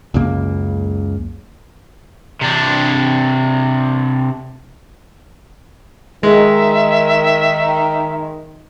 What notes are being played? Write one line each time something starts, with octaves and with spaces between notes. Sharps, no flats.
C#2 F#2 C#3 A#3
C3 D4
D#3 G#3 E5